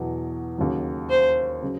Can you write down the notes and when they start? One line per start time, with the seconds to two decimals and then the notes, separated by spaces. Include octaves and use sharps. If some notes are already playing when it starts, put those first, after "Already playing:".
Already playing: E2 B2 F#3
0.58 D#2 C#3 F#3
1.10 C5
1.62 C#3 F#3